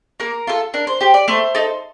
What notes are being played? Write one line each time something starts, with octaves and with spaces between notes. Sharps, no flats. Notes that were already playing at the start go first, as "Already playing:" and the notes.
A#3 A#4
F4 A4
D4 A#4
C5
G4 C5
D5
A3 C5
D#4 A4